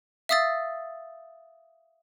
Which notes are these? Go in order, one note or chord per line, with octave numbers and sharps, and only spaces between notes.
E5 F5 D#6 E6 A6